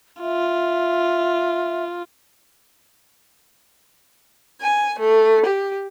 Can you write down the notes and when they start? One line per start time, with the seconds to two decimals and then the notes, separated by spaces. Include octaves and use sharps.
0.21 F4 E5
4.61 G#5
4.99 A3
5.44 G4